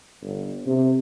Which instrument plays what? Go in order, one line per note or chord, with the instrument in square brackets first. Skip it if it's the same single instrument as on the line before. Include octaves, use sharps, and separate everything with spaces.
[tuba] G1
C3